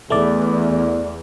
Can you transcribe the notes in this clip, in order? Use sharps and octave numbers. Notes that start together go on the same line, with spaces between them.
E2 A3 D5